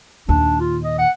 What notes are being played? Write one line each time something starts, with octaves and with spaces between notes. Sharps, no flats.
D#2 A#2 D4
F4
D#5
F#5